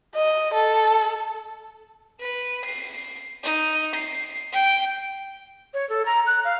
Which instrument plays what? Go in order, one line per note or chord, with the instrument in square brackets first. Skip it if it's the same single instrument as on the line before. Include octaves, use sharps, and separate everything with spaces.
[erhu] D#5
A4
[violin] B4
C7
D#4
C7
G5
[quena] C#5
A4
A#5
F#6
F5